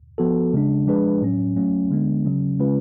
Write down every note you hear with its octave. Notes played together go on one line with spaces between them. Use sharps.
F3 B3 F#4 A4
C#3 G#3 D4
F3 G#3 D4 G#4 B4
A2 F#3 C#4
F#3 A3 C#4
D3 G#3 B3 D4
C#3 F#3 C#4
C#3 G#3 C#4 F4 B4